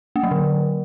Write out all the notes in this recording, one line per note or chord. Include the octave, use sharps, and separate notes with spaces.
A#3
F#3
D3